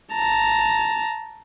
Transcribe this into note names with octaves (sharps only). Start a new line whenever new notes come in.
A5 A#5